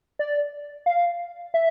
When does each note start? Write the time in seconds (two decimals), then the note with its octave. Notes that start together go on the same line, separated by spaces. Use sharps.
0.19 D5
0.86 F5
1.54 E5